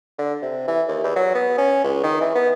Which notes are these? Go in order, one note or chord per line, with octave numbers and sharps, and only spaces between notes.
D3
C3
E3
D#2
E2
F#3
B3
C#4
C#2
D#3
E3
B3